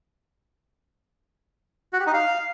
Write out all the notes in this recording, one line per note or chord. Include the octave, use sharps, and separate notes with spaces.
F#4
G4
D#4
F5